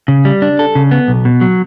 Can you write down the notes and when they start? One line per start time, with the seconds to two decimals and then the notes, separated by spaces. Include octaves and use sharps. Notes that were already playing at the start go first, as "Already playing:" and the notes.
0.08 C#3
0.25 G3
0.42 D4
0.59 A4
0.75 C#3
0.91 B3
1.08 B1
1.25 B2
1.41 F#3